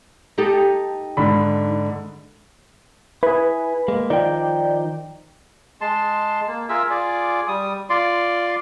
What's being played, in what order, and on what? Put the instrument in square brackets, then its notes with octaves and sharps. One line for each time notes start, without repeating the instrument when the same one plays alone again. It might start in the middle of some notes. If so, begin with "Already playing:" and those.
[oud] D#4 G4 A4
[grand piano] G#2 D3 B5
[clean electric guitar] E4 G#4 [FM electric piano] B4
[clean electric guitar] G#3 A#3
[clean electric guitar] D#3 F3 D#4 [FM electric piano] D5 G5
[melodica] G#3 A5 C6
A#3
F4 G#4 A#4 E5
F4 G#4 D5
G3 D#6
F4 D5 C6